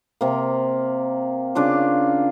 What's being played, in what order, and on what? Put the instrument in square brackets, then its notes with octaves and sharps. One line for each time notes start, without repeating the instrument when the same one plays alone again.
[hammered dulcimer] C3 A#3
C#3 D4 F4 D6